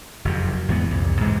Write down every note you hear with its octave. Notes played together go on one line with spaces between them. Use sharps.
F#1 F2 C3
E2 G#2 E3 B3
C2 F2 A#2
G#2 C3 E3